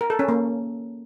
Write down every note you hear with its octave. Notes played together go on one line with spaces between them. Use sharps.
A#4
A4
C#4
A#3